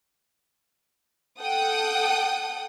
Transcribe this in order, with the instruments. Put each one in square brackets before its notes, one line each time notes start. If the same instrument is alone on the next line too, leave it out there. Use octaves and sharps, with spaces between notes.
[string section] A4 F#5 G5 D#6